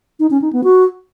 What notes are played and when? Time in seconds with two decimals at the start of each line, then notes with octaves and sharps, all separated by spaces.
0.20 D#4
0.31 C#4
0.42 D#4
0.53 B3
0.64 F#4